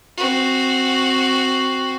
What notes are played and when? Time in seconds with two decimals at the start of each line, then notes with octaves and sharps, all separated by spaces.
0.17 C4 F#4